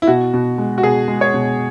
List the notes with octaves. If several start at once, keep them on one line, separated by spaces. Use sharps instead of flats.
E4
B2 F#4
B2
G#3
F#4
B2 G#4
G#3
C#5
B2